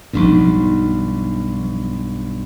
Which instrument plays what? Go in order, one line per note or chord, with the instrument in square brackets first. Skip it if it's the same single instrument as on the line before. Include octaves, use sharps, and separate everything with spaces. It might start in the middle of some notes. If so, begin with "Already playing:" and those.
[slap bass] B1 G2 [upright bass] F3 D#4